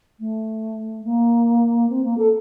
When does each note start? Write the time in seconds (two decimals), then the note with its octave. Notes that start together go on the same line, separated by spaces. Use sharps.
0.19 A3
1.04 A#3
1.89 C4
2.03 A#3
2.17 A4